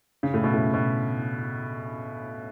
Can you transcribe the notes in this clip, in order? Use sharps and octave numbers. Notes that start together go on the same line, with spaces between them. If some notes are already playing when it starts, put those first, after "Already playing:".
C#3
A2
B2
A2
B2